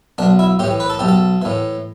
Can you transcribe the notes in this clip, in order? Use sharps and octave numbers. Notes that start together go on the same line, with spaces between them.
B1 D4
E4
A2 E3 G4
B4
A4
B1 G4
A4
A2 E3